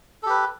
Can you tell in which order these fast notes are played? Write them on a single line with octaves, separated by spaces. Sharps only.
A4 G4 B4